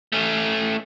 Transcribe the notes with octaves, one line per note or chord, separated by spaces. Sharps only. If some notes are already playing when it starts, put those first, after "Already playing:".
A3 C#4